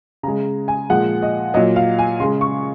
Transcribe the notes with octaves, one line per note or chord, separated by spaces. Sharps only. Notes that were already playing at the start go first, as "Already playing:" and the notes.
C#3 G#3 A#5
G#5
A#2 F3 G#3 F#5
D#5
A#2 F#3 D#5
F5
G#5
C#3 G#3 C6
C#6